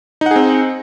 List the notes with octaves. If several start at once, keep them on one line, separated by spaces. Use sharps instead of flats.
C4 D#4 G#4 F#5